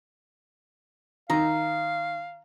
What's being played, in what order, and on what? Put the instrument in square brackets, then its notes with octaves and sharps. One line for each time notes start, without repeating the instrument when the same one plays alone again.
[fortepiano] D#3 [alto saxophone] F5 [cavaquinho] A#5